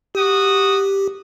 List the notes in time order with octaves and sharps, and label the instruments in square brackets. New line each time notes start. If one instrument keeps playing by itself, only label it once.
[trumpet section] F#4 D#6 [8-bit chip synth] G4